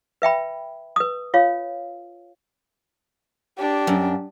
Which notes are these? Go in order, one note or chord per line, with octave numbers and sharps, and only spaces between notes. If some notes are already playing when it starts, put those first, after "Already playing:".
B4 E5 G5 B5
B4 D#6
F4 C#5 F5
D4 G4
F#2